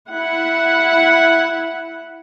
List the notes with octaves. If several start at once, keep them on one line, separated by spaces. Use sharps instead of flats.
E4 F#5